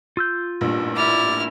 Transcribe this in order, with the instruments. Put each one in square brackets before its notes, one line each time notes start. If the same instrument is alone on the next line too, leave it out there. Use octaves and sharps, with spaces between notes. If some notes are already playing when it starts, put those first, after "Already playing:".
[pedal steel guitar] F4 E6 G6
[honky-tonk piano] A1 G2 A#2
[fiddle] E4 F6 [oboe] D5